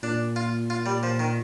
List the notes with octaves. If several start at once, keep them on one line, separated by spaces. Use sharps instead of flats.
A#2 D4
F4
F4
G3
F3
D#3